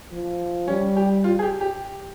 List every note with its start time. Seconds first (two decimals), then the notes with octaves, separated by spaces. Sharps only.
0.12 F3
0.68 G3 C#4
0.96 G4
1.24 F4
1.39 G#4
1.42 G4
1.61 G4